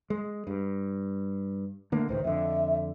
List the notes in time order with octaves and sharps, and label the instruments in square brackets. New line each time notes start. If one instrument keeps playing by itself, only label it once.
[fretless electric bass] G#3
G2
[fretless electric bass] D3 A#3 [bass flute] A3
[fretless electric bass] C#2 A2 D#3 [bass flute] C5
[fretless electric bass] F2 D3 [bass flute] E5